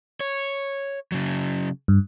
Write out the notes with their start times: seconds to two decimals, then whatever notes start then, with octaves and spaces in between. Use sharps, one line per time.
0.20 C#5
1.12 C#3 F#3
1.88 G2